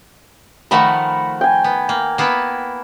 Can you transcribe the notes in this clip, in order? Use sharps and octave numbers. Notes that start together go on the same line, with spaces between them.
D#3 F3 A3 F#5 A#5 B5
G5 G#5
B3
A#3
A#3 B3 E4